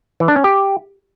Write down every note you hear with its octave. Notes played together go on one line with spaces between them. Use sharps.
E3
D4
C#4
G4